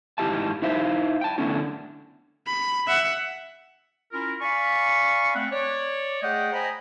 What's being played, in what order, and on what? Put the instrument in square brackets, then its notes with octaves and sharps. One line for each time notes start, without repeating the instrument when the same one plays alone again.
[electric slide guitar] G#2 D#4 E4 G4 E5 A5
D#4 E4 C5 E5 F5
G5 A5
D3 A3 B3 C#4 D4 E4
[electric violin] B5
E5 F#5
[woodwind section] C#4 E4 F4 A#4
D5 F5 G#5 B5 C#6
A3 C4 F#5
C#5 D5
A3 G#4 D#5 F#5 G5
C5 D#5 G5 G#5 A#5 B5